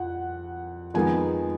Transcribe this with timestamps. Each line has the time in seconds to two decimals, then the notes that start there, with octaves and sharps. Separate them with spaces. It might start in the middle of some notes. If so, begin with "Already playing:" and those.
Already playing: F2 F3 F#5
0.94 F2 D#3 G#3 B3 D#4 G#5